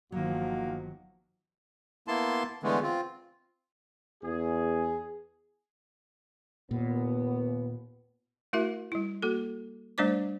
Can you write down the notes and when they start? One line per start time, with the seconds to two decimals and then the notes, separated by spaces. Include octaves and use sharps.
0.12 G1 D#3 F3 F#3 A#3 F#4
2.08 A#3 B3 E4 A5 C6
2.63 D3 E3 G#3 A3 B3
2.83 C4 F4
4.23 E2 G#4
6.71 D#2 A#2 B3
8.53 A3 E4 F#4 A#4 E5
8.92 G3 E4
9.22 A#3 F#4 A4
9.98 G3 A3 D4 C5 D5 D6